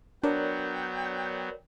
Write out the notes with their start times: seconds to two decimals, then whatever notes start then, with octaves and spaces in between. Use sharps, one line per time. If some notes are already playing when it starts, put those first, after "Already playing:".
0.23 F#3 B3 D4 A#4 C#5 D5 G5